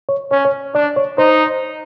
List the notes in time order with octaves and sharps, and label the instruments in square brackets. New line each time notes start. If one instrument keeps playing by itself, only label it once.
[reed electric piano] C#5
[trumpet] C#4 [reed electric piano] C#5
[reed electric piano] C#5
[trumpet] D4 [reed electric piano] D5
[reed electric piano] C#5
[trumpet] D#4 [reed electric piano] C5